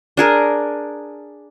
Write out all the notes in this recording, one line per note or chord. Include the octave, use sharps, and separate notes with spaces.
D4 G#4 A#4